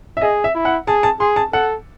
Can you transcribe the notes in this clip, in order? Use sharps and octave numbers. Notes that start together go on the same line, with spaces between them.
E5
G#4 D#5
E5
E4
F#5
G#4 A5
A5
G#4 C6
A5
A4 F#5